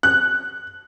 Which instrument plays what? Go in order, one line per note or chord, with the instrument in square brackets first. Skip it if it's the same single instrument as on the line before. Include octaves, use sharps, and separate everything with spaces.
[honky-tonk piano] F#6